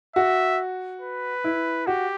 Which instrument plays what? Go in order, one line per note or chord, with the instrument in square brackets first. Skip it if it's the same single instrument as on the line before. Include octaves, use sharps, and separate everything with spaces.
[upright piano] F#4 [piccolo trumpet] E5
[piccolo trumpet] B4
[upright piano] E4
[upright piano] F#4 [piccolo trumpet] G4